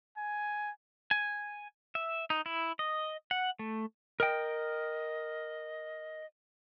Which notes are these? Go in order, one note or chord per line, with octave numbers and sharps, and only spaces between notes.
G#5
G#5
E5
D#4
E4
D#5
F#5
A3
A#4 D#5 G5